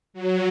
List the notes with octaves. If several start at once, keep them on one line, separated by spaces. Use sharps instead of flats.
F#3